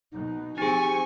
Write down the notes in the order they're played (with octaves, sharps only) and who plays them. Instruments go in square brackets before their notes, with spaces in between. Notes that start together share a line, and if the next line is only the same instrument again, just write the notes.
[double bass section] B2 [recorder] D#4
[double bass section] F3 C4 [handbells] D#4 G#4 [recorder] G4 [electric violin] G#5 C#6